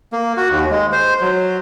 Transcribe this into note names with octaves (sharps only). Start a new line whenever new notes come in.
A#3
F#4
D#2
G#3
C5
F#3